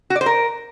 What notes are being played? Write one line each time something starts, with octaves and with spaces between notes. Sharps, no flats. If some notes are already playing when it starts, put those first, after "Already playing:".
F#4
D5
C5
A#4